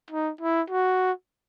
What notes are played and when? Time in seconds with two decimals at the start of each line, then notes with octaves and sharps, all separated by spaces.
0.10 D#4
0.41 E4
0.70 F#4